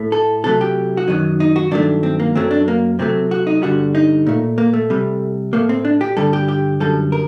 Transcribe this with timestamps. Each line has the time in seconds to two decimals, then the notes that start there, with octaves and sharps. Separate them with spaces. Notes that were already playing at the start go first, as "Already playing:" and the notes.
Already playing: A2 A3
0.12 A4
0.44 C3 F#3 A3 A4
0.61 G4
0.97 F#4
1.08 F#2 D#3 F#3 D#4
1.40 D#4
1.56 F#4
1.71 G2 D#3 F#3 A3 D4
2.03 C4
2.19 A#3
2.35 F#2 F#3 A3 C4
2.51 D4
2.68 A#3
2.99 C3 F#3 A3 C4
3.31 F#4
3.47 D#4
3.62 G2 D3 G3 F#4
3.95 D#4
4.26 A#2 A3
4.58 A#3
4.74 A3
4.90 C3 G3
5.53 A2 A3 A#3
5.69 C4
5.85 D4
6.01 G4
6.17 G2 D3 G3 A4
6.33 G4
6.49 G4
6.80 F#2 D3 G3 A4
7.12 A#4